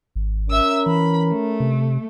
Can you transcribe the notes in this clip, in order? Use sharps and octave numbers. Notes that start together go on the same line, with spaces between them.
G#1
C#4 A#4 E5 E6
E3 B5
A3
C3